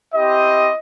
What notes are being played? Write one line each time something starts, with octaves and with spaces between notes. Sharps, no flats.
C4 E4 G4 D#5